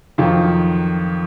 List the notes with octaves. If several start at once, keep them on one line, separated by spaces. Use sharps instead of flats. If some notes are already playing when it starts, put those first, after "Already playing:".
F2 D#3 F#3 F4